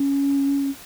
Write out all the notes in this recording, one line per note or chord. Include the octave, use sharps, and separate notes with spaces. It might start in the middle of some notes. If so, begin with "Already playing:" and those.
Already playing: C#4